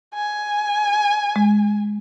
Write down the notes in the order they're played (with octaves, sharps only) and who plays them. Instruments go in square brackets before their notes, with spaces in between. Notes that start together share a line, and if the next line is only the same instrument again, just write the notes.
[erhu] G#5
[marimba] G#3